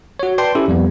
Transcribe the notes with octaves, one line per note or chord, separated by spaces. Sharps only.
F#4 C#5
B4 D5 G5 A5 C6
C#4 E4 G4 A4
F2 G3 B3